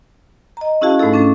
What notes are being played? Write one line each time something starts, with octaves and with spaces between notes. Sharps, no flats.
D#5 A#5
C#4 E4 F#4 G#4 F5 A5
G#2 A3 D#4 E4 A4
A3 C#4 D4 A4